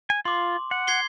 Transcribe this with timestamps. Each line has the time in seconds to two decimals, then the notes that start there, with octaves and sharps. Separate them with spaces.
0.10 G#5
0.25 F4 C6 D6
0.71 F#5
0.87 G#6 C7 G7